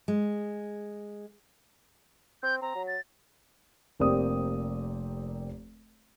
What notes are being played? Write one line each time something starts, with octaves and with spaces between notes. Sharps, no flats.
G#3
C4 G6
C4 A#5
F#3
A6
F1 A#3 C4 G4 D5 D#6